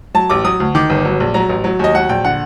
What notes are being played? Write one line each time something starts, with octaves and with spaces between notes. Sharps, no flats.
F#3 A5
A1 D6
F#3 D#6
D2
D#3 D6
G1
F#3
A#1
F#3 A#5
A1
F#3
D#2 D#5
F#3 F#5
A#1 G5
D3 F#5